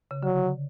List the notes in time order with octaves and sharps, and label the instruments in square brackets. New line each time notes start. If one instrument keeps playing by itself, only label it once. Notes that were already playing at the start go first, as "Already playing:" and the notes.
[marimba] C#3
[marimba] D3 [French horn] F#3